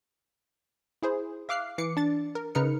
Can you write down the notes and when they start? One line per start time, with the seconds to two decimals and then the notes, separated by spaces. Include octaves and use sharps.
1.03 E4 G#4 C5
1.49 E5 F5 D6 F6 F#6 C7
1.78 E3 D6 C7 C#7
1.97 D4 A6
2.35 A#4
2.55 C#3 D#4 A#4 B4 F6 C#7